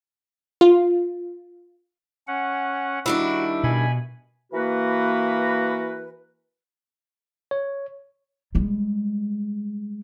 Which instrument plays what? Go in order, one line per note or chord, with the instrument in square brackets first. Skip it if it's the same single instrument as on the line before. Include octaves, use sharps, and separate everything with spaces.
[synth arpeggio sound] F4
[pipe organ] C#4 F#5
[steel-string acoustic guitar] D#3 G3 D4 [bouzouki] E4 [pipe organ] F#4
[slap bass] B2 [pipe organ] G#5 B5
[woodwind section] E3 A#3 F#4 A#4 B4
[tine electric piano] C#5
[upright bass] G3 G#3